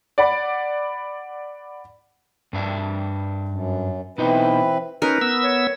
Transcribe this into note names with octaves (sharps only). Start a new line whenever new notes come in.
D5 F#5 B5
G2 D4 E5
F#2
B2 E3 C4 D#4 B4 D#5
C#4 D#4 A#4 B4
B3 E6
C#5